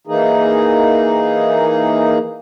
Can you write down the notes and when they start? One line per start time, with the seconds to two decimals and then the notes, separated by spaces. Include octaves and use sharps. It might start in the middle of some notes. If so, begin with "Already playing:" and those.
0.07 E3 A#3 D#4 G#4